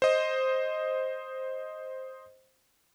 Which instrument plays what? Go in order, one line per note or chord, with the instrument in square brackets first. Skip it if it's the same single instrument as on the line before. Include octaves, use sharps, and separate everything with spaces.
[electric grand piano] C5 D#5